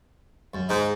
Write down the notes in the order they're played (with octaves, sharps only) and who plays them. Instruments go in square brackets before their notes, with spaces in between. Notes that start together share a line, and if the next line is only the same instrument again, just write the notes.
[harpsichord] F#2
[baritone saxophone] G#2 [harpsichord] D#4 G#4